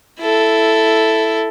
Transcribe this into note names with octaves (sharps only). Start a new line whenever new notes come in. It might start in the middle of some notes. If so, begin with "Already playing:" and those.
E4 A4